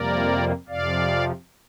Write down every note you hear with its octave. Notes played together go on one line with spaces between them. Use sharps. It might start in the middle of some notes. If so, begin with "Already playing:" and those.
Already playing: F2 C3 G3 A#3 A#4 D5
F2 C3 F3 D5 F5